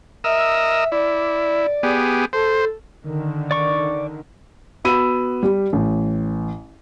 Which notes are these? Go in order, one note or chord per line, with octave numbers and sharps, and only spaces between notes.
A#4 D#5 E5 E6
E4 D5
B3 G4 G#4
A4 C5
D3 D#3
D5 C#6
B3 F#4 B5 E6 D#7
G3
A1